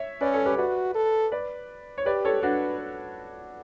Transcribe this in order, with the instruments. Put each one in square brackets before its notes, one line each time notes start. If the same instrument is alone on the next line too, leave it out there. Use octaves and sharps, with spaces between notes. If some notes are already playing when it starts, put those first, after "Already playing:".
Already playing: [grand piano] C#5 E5
[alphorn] C#4 [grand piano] B4 D5
[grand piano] A4 C#5
G4 B4
[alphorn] F#4 [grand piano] B4 D5
[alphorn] A4
[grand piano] B4 D5
C#5
[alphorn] G4 [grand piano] B4 D5
[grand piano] A4 C#5
[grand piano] D4 F#4 [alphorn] B4